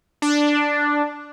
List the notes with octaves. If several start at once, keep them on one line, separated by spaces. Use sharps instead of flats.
D4